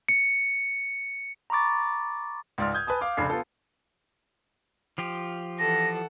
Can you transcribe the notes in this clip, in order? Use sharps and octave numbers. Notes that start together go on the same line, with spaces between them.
C#7
A#5 B5 C#6 D6 A6
C#2 G#2 D5 C6 F6
D#6 G6 G#6
B4 G#5 A5 D#6
F5 D6
F1 C#3 D4 B5 C7
B3 F4 A4
F3 F4 G4
E3 A4 F#5 A#6